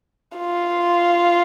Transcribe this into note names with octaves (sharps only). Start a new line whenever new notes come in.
F4